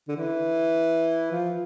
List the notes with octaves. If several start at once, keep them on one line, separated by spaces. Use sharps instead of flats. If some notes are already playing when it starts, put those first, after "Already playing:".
D3
E3
F3